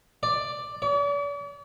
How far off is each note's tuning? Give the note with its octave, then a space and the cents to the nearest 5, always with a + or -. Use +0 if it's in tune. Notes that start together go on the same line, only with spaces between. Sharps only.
D5 +5
D5 -45